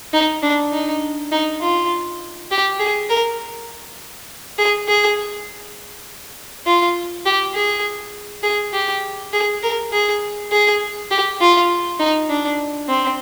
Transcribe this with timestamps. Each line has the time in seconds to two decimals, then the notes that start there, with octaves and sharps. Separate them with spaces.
0.13 D#4
0.42 D4
0.73 D#4
1.32 D#4
1.61 F4
2.51 G4
2.80 G#4
3.09 A#4
4.58 G#4
4.88 G#4
6.66 F4
7.26 G4
7.54 G#4
8.43 G#4
8.73 G4
9.33 G#4
9.63 A#4
9.93 G#4
10.52 G#4
11.11 G4
11.41 F4
11.99 D#4
12.29 D4
12.88 C4